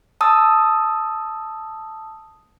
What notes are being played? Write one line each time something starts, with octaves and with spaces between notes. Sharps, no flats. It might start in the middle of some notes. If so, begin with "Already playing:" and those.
A5 D#6 E6